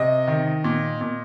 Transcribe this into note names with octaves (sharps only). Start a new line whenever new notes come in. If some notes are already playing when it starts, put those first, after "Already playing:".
Already playing: C3 D#5
D#3
A#2
A#2